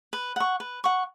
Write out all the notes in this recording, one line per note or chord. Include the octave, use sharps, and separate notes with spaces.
B4
F#5 C#6
B4
F#5 C#6